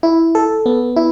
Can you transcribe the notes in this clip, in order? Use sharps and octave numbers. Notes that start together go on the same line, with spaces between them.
E4
A4
B3
E4